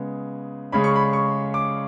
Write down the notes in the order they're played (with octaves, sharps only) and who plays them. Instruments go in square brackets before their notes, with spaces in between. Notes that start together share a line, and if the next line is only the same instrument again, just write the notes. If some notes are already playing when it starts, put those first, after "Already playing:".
Already playing: [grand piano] C#3 G#3 B3
C#3 G#3 C#4 B5
C#6
B5
C#6
D6